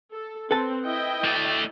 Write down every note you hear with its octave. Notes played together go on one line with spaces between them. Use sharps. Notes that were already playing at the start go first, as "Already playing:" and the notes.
A4
C4 A4 B4 A5
E4 D#5 G5
A3 D5